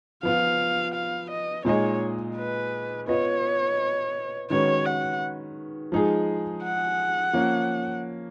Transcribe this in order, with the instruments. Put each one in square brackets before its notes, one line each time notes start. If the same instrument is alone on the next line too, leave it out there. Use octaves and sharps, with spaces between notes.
[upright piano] F3 B3 F4 [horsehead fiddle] F5
[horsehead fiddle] F5
D#5
[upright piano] A#2 G#3 D#4 G#4 D#5 [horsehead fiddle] C#5
[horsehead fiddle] B4
[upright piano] B3 F4 B4 D#5 [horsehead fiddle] C#5
[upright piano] D#3 G#3 C#4 F#4 B4 [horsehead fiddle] C#5
[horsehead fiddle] F#5
[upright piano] F3 G#3 D#4 G#4
[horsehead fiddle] F#5
[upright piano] F3 A#3 C#4